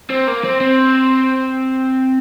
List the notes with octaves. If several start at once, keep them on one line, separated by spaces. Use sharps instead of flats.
C4
A#3
C4
C4